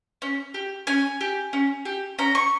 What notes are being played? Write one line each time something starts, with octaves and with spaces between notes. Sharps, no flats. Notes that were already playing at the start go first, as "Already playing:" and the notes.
C#4
G4
C#4 G#5
G4
C#4
G4
C#4 A#5
C#6